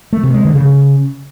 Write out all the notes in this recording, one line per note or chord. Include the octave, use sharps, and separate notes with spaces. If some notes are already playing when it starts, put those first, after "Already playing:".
A3
C3
G#3
D3
C#3